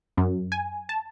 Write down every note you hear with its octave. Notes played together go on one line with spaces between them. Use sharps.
F#2
G#5
A5